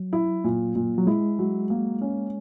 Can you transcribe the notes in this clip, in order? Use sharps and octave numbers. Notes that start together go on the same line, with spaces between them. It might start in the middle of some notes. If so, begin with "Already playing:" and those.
Already playing: F#3
E4
A#2
A#2
F#3
G#3 E4
F#3
A#3
C#4